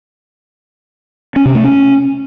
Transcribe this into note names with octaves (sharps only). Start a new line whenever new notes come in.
C#4
C3
A3
C#4